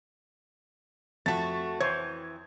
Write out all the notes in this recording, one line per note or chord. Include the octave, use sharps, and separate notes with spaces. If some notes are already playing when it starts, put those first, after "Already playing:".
F2 A3 F#4 A5 A6 B6
E3 C5 C#5 G#6